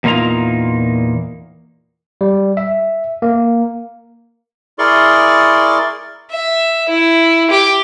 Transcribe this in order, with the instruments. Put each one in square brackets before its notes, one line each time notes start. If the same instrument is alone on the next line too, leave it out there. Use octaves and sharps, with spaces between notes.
[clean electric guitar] E2 A#2 A#3 D#4 F4 A#5
[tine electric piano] G3
E5
A#3
[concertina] E4 G#4 A#4 D5 C6 C#6
[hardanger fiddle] E5
E4
G4